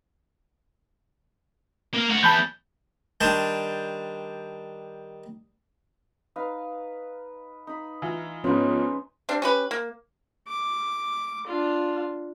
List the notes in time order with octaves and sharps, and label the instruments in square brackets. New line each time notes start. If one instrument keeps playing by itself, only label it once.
[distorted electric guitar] A#3 F5
A3 F#4
[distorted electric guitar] E2 E3 [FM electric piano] A5 B5 G6
[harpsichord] D#3 G3 D4 G4 C5
[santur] D#4 B4 F5
D#4 B5
[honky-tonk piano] E3 F4
[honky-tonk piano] G#2 F3 [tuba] B3 [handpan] C#4 [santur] D#4 B4 C5
[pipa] G3 C4 D4
C#4 G4 B4
A#3
[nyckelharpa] D6
D4 F4